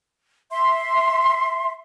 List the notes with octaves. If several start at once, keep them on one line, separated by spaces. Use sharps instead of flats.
E5 C6